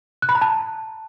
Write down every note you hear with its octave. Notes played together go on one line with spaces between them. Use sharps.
F#6
B5
A#5
A5